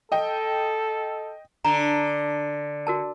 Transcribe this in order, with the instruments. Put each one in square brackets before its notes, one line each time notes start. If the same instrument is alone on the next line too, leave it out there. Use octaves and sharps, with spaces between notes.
[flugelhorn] A4 [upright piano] D#5 G5
[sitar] D3 [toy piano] A#5
[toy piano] F#4 A#4 A5